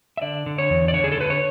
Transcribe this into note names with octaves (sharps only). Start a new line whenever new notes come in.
E5
D3 D5
D3
C#5
E2
D5
D3 C#5
G#4
A4
D3 B4
C#5